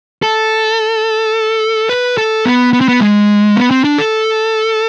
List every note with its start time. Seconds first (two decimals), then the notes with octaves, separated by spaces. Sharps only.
0.23 A4
1.89 B4
2.18 A4
2.45 B3
2.73 B3
2.81 C4
2.88 B3
3.01 G#3
3.56 B3
3.71 C4
3.84 D4
3.98 A4